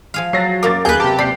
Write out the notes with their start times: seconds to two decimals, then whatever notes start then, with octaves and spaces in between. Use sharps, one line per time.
0.14 F3 G#4 F5
0.33 F#3 A6 A#6 C7
0.63 F#2 A#3 A#4 D6 A6
0.85 D#2 G#4 A#4 B4 F#6 G6
1.00 C3 G4 A5
1.19 D5 B5 C7